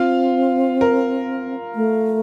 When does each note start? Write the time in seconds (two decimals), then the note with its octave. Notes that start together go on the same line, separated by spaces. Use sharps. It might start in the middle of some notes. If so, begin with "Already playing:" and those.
Already playing: C4 F4 F5
0.81 A#4
1.75 A3